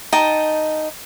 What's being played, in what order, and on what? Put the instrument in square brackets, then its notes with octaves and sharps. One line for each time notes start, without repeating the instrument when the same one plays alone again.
[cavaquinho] D#4 D#5 G5 A5